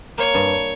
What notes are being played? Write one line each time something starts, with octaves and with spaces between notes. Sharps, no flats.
A#3 C#5
G2